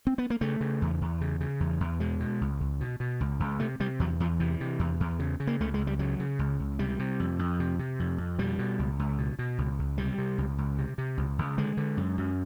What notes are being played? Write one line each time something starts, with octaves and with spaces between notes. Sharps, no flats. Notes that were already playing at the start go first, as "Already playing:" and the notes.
C4
B3
A#3
C#3 A3
C#3
E2
E2
C#3
C#3
E2
E2
B2 G#3
B2
C#2
C#2
B2
B2
C#2
C#2
C3 A3
C3 G3
E2 F#3
E2 F3
C3 E3
C3
E2
E2
C#3
C#3
A#3
C#2 A3
G#3
C#2
G3
C#3 F#3
C#3
C#2
C#2
C3 G3
C3
F2
F2
C3
C3
F2
F2
B2 G3
B2
C#2
C#2
B2
B2
C#2
C#2
C3 G3
C3
C#2
C#2
C3
C3
C#2
C#2
D3 G#3
D3
F#2
F#2